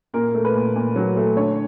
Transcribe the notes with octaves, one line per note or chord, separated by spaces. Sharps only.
A#2 A#4
A3
B4
A#2
A#2
F#3
A3
D3 C#5